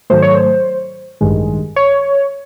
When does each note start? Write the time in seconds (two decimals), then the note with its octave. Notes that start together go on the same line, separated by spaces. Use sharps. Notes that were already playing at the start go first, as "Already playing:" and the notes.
0.10 G#2 D#3 F#3 A3 C5
0.22 C#5
0.35 C5
1.21 A1 G2 D#3 G#3
1.76 C#5